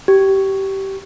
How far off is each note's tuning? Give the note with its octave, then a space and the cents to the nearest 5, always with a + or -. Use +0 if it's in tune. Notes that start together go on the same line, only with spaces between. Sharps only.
G4 -20